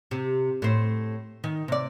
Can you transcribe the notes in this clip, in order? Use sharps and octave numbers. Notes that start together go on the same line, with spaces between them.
C3
A2 C5
D#3
C3 D5